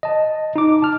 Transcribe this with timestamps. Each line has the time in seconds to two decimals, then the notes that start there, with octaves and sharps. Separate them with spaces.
0.03 D#5 A5
0.56 D#4 D6
0.82 A5 F6